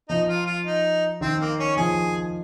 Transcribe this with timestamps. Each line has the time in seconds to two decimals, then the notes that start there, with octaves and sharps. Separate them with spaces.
0.09 F3 D#4
0.28 F4
0.46 F4
0.65 D#4
1.21 D#3 C4
1.40 A#3
1.59 C#4
1.77 F3 G#4